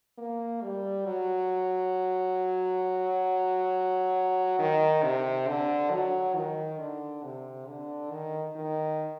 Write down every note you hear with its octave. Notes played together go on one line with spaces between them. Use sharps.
A#3
G3
F#3
D#3
C3
D3
F#3
D#3
D3
C3
D3
D#3
D#3